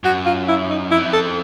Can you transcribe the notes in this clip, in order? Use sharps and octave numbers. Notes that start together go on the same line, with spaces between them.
F#2 F#4
F4
E4
D#4
F2 E4
A4